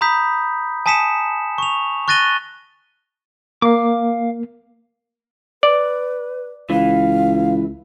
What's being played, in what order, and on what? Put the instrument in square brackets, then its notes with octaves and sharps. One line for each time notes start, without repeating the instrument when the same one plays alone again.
[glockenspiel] A#5 B5 D#6 G6 B6
G#5 A5 D#6 B6 C#7 E7
C#6 F7
C#6 F#6 A6 A#6 D#7 G7
[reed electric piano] A#3 [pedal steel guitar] F5 D6
[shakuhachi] B4 [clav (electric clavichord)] D5
[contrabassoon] C#2 [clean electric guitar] E3 [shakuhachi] F5